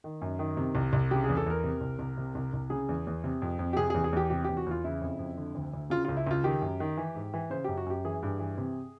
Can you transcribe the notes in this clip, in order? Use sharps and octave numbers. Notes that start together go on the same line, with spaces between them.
D#3
F#2
D#3
C3
C2
C2
C#3 G4
E2 G#4
A4
E2 A#4
C3
C2
C2
C3
C2
C2
C#3 G#4
E2
E2
C3
F2
F2
G4
C3 G#4
E2 G#4
G#4
E2 G4
C3 G4
E2 G4
F#4
E2 F4
C#3 E4
F2
F2
D3
D2
D2
C#3 F4
C#2 F4
E4
C#2 F4
D#3 G4
F#2
D#3
E3
G#2
E3
C#3 C5
F#2 G4
F#4
F#2 G4
E3 G#4
G2
E3
C3